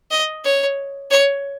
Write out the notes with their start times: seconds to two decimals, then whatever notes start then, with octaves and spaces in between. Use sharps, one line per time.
0.11 D#5
0.44 C#5
1.11 C#5